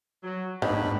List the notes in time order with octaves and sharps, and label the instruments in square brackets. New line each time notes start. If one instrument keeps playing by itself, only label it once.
[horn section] F#3
[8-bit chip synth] G#2 [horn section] B2 D4 B5 [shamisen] D#3